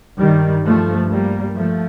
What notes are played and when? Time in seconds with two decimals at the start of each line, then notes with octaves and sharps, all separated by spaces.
0.19 G2 D#3 G3
0.65 F3 A3
1.10 G3 A#3
1.56 F3 A3